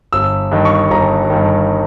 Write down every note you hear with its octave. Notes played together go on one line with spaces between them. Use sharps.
G1 E6
G2 D#3
C#6
G1 A#5
G2 D#3